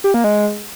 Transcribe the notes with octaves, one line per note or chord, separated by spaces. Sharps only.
G4
A#3
G#3